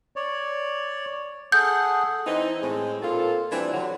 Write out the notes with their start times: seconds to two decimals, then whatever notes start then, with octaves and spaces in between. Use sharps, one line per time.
0.16 C#5 D5
1.52 G#4 A4 F#5 G6
2.26 E3 C4 D#4
2.62 A2 G#3 C4
3.02 A#2 C4 F4 A4
3.52 E3 G3 C4 D4
3.73 D3 F#3